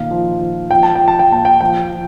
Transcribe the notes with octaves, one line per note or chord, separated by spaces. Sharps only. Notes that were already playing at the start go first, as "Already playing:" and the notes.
Already playing: A#2 D#3 F5
F3
F3
F3 G5
A5
F3 G5
A5
G5
A#2 A5
G5
F3 G5
F3